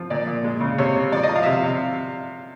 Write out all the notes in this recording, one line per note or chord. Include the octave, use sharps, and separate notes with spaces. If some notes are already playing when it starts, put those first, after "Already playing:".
Already playing: F3
A#2 D5
A#2
G#3
C#3
C3 C#5
G#3
F3 D5
D#5
F3
F5
C3 E5
F5
C3